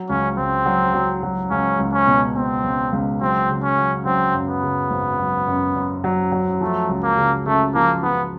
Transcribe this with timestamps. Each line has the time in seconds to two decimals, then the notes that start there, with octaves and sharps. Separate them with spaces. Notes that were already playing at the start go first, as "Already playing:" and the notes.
Already playing: F#3
0.09 C#2 C#4
0.37 C#2 C4
0.66 F#3
0.94 F#3
1.23 F#3
1.51 C#2 C#4
1.79 C#2
1.93 C#4
2.07 B2
2.36 B2 C4
2.64 C#2
2.92 C#2
3.21 F#3 C4
3.49 C#3
3.63 C#4
3.78 F#3
4.06 F#3 C4
4.34 F#2
4.48 B3
4.63 C#3
4.91 G#1
5.19 F#3
5.48 F#2
5.76 F#2
6.04 F#3
6.32 F#3
6.61 F3 A3
6.89 C#2
7.03 A#3
7.18 C#3
7.46 C#3 A3
7.75 F3 A#3
8.03 F3 B3